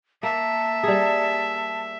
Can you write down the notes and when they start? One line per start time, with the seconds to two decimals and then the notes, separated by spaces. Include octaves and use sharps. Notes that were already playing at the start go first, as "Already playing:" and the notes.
0.23 A#3 E5 A5
0.83 G3 G#4